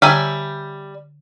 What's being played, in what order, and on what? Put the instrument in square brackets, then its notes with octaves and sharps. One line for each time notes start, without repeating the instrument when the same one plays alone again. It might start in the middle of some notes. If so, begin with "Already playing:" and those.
[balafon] D3 A#5 [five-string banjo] G3 E5 G#5